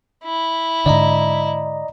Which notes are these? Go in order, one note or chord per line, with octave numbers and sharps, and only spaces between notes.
E4
G#2 D3 D5 D#5 A#5